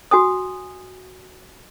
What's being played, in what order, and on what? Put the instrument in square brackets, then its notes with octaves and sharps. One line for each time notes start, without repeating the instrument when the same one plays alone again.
[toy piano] F#4 G#5 D#6